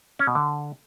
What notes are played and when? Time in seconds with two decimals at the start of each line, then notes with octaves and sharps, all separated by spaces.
0.19 C#4
0.27 B2
0.35 D3